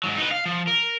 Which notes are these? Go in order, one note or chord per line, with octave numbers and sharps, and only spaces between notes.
G#2 F#3
D#4 B4
F5
F3
A#4